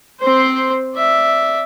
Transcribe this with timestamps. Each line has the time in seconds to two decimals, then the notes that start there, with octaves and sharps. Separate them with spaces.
0.20 C4 C5
0.95 D5 E5